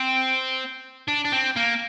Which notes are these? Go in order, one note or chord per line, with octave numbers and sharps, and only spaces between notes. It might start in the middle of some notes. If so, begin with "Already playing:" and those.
Already playing: C4
D4
D4
C4
A#3